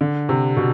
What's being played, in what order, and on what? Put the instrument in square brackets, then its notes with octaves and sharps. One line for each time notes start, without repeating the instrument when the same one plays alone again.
[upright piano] D3
C3
B2